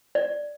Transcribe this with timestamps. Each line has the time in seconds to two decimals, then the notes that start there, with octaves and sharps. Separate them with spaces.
0.15 D5